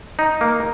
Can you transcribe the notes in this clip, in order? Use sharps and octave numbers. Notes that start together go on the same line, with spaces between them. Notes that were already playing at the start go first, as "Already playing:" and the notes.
D#4
A#3